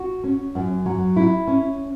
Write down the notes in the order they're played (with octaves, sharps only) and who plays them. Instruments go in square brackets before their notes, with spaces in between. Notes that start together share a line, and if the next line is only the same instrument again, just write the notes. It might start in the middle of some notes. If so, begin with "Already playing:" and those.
Already playing: [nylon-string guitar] F#4
C#4
F#2
F#3
E4
C#4